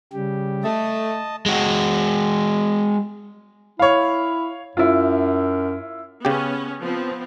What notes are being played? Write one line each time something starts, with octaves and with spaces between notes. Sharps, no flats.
C#3 G3 G4
A3 D#5 A5
G#3 F#4
E4 C#5 F5
F#2 E4 F4
C#3 B3 C#4 G4
F3 B3 C4